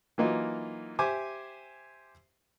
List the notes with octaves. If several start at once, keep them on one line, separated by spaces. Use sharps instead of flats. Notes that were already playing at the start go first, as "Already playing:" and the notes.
E3 F#3 A#3 D#4 F4
G4 C5 E5 G#5 D6